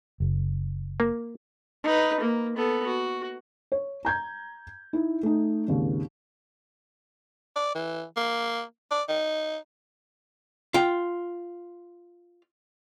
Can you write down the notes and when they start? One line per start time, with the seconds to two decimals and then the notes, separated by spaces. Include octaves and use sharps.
0.20 F#1
1.00 A#3
1.84 D#4 B4
2.20 A#3
2.57 B3 A4
2.87 F#4
3.72 C#5
4.05 A#5 G6 G#6
4.93 D#4 E4
5.23 A3 D#4
5.68 G#1 D#2 C#3
7.56 D5
7.75 E3
8.16 A#3
8.91 D5
9.09 D#4
10.74 F4 G5